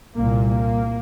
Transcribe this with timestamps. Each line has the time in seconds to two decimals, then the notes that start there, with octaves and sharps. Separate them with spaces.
0.16 C2 A#2 A#3
0.51 A#3